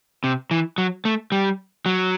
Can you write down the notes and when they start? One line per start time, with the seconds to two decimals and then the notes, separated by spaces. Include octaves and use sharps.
0.24 C3
0.51 E3
0.78 F#3
1.05 A3
1.32 G3
1.86 F#3